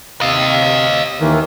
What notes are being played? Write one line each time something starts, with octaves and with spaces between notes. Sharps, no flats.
C3 D#5 F5
D#2 D#3 E3